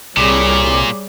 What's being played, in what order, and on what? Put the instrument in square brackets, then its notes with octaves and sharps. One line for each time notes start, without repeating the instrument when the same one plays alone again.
[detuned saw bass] C2 [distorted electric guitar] A#2 [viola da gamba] G3 G#4 C#5 [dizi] D6